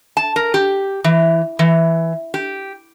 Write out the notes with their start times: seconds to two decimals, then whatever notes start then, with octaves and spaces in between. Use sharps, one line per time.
0.17 A5
0.36 A#4
0.54 G4
1.04 E3
1.59 E3
2.34 G4